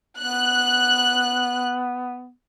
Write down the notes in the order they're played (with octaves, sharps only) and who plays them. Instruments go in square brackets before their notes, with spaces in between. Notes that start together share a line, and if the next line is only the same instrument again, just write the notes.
[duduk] B3 [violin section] F#6